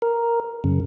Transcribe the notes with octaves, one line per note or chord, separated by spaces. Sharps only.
A#4
F#2 C#3